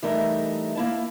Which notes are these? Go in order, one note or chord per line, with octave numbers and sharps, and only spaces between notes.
E3 G3 A3 D#4 A4 A#4
A#3 E4 A5